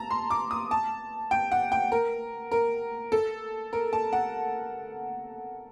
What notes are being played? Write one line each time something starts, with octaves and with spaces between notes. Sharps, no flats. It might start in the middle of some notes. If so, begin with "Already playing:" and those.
Already playing: A5 A#5
C6
D6
D#6
A5
G5
F#5
G5
A#4
A#4
A4
A#4
A5
F#5